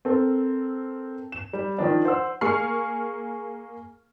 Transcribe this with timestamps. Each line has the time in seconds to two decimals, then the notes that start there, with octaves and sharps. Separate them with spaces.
0.05 C4 A4 A#4
1.32 E7
1.53 G3
1.78 D#3 F3 D4
2.05 C5 F#5 E6
2.41 A#3 G#4 C#6 F6 C7